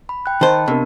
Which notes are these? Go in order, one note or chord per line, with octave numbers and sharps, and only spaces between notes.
B5
G5 F#6
D#3 C5 D#5 A5 B5
C3 B3 D4 A#4